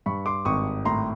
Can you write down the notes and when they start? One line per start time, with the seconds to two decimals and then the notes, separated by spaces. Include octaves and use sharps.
0.06 G2 B5 C#6
0.26 C6 D6
0.45 G#1 C#6 D#6
0.85 A2 A#5 C6